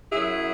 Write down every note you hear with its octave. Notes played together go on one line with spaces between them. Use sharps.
F#2 F#3 E4 G#4